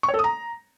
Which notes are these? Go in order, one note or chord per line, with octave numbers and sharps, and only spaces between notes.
C#6
C#5
A4
D#6
A#5